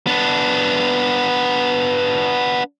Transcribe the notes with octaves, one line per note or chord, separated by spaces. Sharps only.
B3 D4